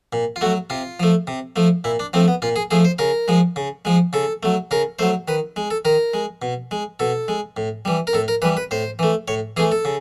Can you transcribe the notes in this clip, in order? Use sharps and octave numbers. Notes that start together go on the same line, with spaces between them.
A#2
F4
F#3 A3 F#4
C3 F4
F3 A3
C3
F3 A3
A#2 E4
D4
F3 A3 C4
B3
A#2 F4
G#4
F3 A3 G#4
C5
C#3 A#4
F3 G#3
C#3
F3 G#3
C#3 A4
F#3 A3
C#3 A#4
F#3 A3 C5
D#3 B4
G#3
A4
D#3 A#4
G#3
B2
G#3
B2 A4
G#3
A2
E3 G3
A#4
A2 A4
A#4
E3 G3 B4
B4
A2 C5
E3 A3
A2 C#5
E3 A3 G#4
A4
C#3